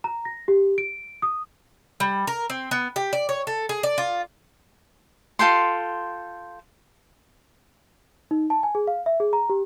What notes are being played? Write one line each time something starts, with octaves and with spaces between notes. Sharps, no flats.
A#5
A#6
G4
D7
D#6
G3
A#4
C4
B3
G4
D5
C#5
A4
G#4
D5
F4
F4 A4 G5 C6
D#4
A5
G#5
G#4
F5
E5
G#4
A#5
G4